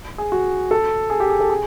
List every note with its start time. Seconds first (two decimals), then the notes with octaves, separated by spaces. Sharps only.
0.18 G#4
0.32 F#4
0.71 A4
1.10 G#4
1.20 G4
1.30 G#4
1.40 A4
1.50 G#4